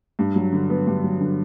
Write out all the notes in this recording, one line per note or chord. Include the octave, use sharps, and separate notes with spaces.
G2
F#3
D3
B3
G2
F#3
D3